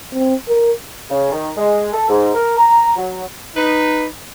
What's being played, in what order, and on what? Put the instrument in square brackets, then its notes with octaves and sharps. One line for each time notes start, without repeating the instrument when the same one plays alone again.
[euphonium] C4
A#4
[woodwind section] C#3
D#3
G#3
A4
G#2
A#4
A#5
F#3
[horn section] D#4 B4